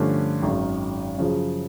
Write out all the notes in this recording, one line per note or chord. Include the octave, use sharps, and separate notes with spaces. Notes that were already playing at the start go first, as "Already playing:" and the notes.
Already playing: G2 D3 F3 A3 C#4
G#1 F#2 D#3
F#2 C#3 F3